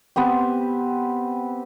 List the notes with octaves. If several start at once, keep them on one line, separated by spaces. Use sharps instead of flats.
B3 C4 G4